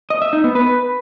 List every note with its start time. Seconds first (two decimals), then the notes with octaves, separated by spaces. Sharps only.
0.10 D#5
0.22 E5
0.33 D#4
0.44 B3
0.55 B4